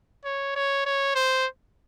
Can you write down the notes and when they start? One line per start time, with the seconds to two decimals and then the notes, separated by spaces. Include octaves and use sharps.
0.25 C#5
0.56 C#5
0.86 C#5
1.15 C5